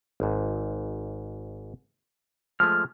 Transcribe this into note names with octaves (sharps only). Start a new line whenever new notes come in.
G#1 G#2
F3 G#3 A3 F6